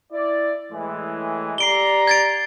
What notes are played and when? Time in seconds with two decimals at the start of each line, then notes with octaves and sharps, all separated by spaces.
0.12 E4 D5
0.71 A2 E3 G#3
1.58 G4 D5 A#5 C7 D7 G7
2.07 G#6 A6 D7